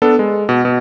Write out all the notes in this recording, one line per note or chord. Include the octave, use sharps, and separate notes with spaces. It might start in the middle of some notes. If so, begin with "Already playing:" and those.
B3 D4 A4
G#3
B2
B2